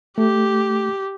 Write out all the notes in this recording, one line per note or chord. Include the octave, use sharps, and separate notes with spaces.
A3 G4